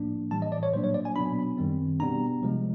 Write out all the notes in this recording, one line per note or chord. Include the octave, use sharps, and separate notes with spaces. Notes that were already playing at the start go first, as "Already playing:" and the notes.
Already playing: A2 F3 A#3 D4
A2 E3 G3 A5
D#5
D5
C#5
A#2 F#3 A#3 D4 C5
C#5
D5
G#5
B2 F#3 B3 D4 B5
F#2 D#3 G3 C4
B2 G3 B3 D4 A#5
C3 F3 G#3